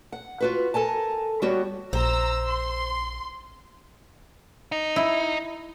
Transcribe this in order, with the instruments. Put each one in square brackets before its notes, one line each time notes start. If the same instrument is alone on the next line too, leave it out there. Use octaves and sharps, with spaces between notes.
[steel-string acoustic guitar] F#5
F4 F#4 B4
A4 A#4 G#5 A5
G3 B3 F#4 G4 C#5
[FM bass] A#1 [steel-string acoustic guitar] C5 [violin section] A#5 E6
[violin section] C6
[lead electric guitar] D#4
[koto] E4